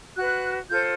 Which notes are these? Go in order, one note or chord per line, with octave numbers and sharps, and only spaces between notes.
F#4 B4 F#6
F4 A4 C5 G6